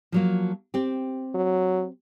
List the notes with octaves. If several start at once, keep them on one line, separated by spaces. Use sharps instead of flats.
F3 F#3 A#3
C4 G4
F#3